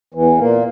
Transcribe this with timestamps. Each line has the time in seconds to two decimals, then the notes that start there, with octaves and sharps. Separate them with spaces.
0.14 E2 E3
0.38 A#2 A#3